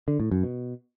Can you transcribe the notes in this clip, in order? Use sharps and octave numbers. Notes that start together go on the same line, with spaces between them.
D3
A2
F#2
B2